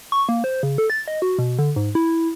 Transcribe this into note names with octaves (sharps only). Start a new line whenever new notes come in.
C#6
A#3
C5
C#3
A4
A6
D#5
F#4
B2
D3
G#2
E4